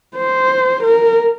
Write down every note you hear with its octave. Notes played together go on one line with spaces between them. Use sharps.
C5
A#4